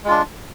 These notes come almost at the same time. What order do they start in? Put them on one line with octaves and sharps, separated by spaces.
G#3 F4 D4